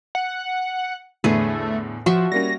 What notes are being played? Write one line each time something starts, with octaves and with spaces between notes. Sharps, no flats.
F#5
E2 A2 D3 A3 G#4 B4
F3 F#4 E5
G3 A#3 C#4 A#6